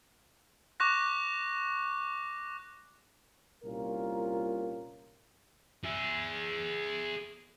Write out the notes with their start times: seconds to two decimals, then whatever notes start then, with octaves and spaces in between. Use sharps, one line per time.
0.80 C#6 D6 F#6 A#6
3.64 C2 A#2 C#4 F4 A#4
5.85 G#4 E5